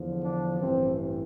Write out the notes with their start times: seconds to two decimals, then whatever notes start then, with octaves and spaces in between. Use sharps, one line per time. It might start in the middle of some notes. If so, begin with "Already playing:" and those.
Already playing: E2 D3 F3
0.23 D4
0.60 A1 G2 E3 C4